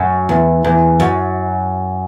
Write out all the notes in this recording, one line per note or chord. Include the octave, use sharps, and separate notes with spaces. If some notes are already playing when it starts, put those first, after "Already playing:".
Already playing: F#2
E2
E2
F#2